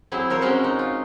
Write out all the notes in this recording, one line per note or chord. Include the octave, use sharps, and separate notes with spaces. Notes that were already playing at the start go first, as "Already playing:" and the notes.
F#3 C4 E4 G#4
F3 A#4 C5 C#5
G#3 C4 C#4 F#4 A#4 C#5
D#4
F4